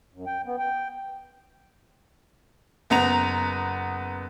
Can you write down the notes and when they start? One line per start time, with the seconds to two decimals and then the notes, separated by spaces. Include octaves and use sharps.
0.14 F#2
0.26 G5
0.46 B3
0.59 G5
2.90 F#1 B3 A#5 F7